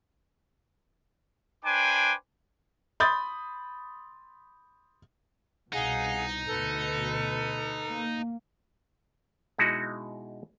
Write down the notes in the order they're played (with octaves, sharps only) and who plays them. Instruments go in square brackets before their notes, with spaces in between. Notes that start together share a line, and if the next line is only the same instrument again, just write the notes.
[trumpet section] D4 B4 C5 G5 G#5 D6
[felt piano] B5 C6 D#6 G6 A6
[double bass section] C2 B2 [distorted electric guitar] D#4 [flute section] G#4 F5 F#5
[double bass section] D2 B2 [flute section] A4 B4
[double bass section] A#3
[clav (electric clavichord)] B2 G#3 D#4 E4 F#4